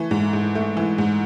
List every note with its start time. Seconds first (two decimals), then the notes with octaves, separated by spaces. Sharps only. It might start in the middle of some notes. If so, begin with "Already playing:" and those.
Already playing: E3 A3
0.11 G#2
0.33 G#2
0.55 A3
0.77 E3
0.98 G#2